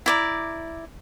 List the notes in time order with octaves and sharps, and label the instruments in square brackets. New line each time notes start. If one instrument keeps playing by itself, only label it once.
[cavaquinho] E4 D5 A#5